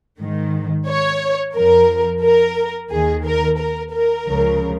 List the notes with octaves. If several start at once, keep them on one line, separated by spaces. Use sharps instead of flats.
G#2 D#3
C#5
F2 F3 A#4
A#4
D#2 D#3 G#4
A#4
A#4
A#4
C#2 C#3 F3